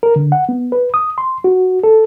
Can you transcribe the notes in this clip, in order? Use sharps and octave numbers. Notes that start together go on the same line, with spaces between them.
A#4
D3
F#5
B3
B4
D#6
C6
F#4
A4